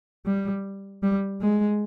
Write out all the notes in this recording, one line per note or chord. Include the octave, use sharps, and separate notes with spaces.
G3
G3
G#3